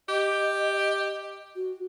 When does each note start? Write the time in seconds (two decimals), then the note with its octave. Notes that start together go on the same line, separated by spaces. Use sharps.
0.09 G4 D#5
1.56 F#4